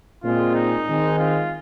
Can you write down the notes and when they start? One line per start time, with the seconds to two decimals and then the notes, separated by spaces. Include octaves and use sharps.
0.22 A#2 G#3 C4 F4
0.55 D#4
0.87 D#3 G#3 C4
1.19 F4